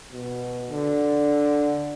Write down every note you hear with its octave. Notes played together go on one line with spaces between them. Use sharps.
B2
D3